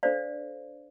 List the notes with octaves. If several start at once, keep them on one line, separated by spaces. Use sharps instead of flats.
D4 A4 C5 D5 F5